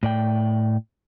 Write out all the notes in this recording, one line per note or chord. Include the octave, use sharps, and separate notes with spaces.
A2 D5 G5